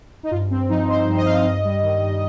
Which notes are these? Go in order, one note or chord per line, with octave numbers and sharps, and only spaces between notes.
D#4
G2 F4
G2 C4
F3 D#4
F3 C5
G2
D#5
G2 F5
D#5
G2
G3
D#3
G2